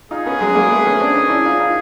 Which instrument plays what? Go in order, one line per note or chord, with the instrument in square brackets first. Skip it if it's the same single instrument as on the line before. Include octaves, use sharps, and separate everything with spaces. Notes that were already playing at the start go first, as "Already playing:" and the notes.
[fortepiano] D#4 F4 [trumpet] G#4
[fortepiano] B3 C#4
F#3 G#3
G#3 A#3
A3 B3
B3 C#4
C4 D4
C#4 D#4
D4 E4
D#4 F4
D#4 F4